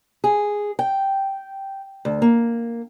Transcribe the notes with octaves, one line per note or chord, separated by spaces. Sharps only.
G#4
G5
D2
A#3